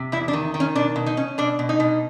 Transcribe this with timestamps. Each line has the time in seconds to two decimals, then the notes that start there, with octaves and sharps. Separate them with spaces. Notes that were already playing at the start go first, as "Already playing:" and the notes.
Already playing: C3
0.12 E2 E4
0.28 D4
0.33 D#3
0.54 D#3
0.60 C#4
0.75 B2 D4
0.96 B2
1.06 D#4
1.17 C#4
1.38 B2 D4
1.59 B2
1.69 D#4
1.80 B2